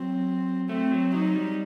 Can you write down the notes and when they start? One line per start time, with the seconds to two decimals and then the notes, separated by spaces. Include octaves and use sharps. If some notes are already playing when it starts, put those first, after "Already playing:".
Already playing: F#3 C4
0.69 A3 C4
0.91 F#3
1.14 F#3 D#4
1.35 G3